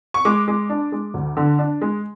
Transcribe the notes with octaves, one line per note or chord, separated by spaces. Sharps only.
C#6
G#3 D6
G#3
D4
G#3
D2
D3
D4
G#3